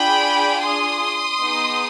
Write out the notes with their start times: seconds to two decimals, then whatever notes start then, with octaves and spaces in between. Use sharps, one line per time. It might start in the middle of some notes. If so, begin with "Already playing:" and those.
Already playing: D4 F4 G#4 G5 B5
0.62 C6 D#6
1.40 B3 D#4 G#4